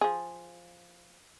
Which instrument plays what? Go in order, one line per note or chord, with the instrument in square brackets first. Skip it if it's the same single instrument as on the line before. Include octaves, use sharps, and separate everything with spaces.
[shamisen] F3 G#4